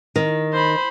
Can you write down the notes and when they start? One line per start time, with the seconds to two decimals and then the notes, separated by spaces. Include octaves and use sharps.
0.16 D#3
0.53 C5 B5